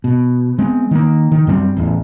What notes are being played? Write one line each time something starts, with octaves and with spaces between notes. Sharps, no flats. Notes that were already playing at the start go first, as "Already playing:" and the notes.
B2
G#3 B3 C4
D#3 A#3
D#3
F#2 G3 A3 C4
A1 E2